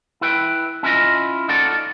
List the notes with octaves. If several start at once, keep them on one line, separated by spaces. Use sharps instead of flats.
E4 B4 G5
C#4 E4 F4 D#5
D#4 F4 F#4 A4 D5